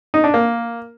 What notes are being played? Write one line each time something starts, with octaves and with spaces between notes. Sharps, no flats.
D#4
D4
A#3